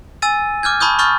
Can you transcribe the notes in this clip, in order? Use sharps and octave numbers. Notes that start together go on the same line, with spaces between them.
G#5 E6 A6 D#7
D6 F6 G6 G#6
A5 B5 C#6 D#6 G6
B5 C#6 D#6 F6 G6 A6